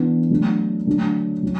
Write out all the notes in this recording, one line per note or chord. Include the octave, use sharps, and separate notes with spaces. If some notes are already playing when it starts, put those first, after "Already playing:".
Already playing: E3 B3 D4
F#3 A3 D4
D3 F#3 A3 D4
F#3 C#4